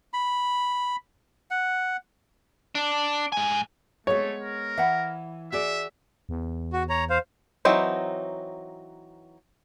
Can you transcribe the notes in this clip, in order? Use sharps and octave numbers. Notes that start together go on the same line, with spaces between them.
B5
F#5
D4
G#2 G#5
G#3 A3 B3 C#5
A#4
E3 E5 F#5 B5
F#4 G#4 D5 E5
E2
F#4
C#5 A#5
C5 F5
E3 F#3 C4 D#4